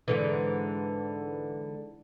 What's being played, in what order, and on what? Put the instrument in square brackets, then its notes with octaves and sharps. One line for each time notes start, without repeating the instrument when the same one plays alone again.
[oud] G#2 D3 E3